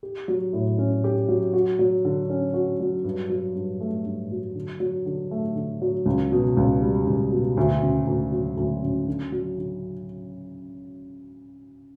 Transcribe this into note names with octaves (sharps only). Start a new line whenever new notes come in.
G4
F#3
A2
C#4
G4
F#3
F#4
F#3
D3
C#4
F#4
F#3
G2
F#3
G2
A3
G2
F#3
D3
F#3
D3
A3
D3
F#3
C#2
B2
C#2
G3
C#2
B2
D2
C#3
D2
F#3
D2
C#3
D3
F#3
D3